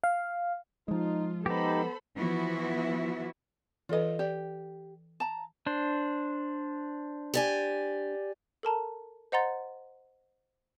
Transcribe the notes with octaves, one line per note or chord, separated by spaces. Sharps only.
F5
F3 G#3 D#4 F4
B3 D#4 G4 A4 C5 B5
E3 F3 B3 E4 F#4
E3 F4 A4 B4 D#5
G4 D5
A5 A#5
D4 C5
G4 D5 G#5
A4 A#4 A5 A#5
C5 D#5 F#5 A#5 C6 A6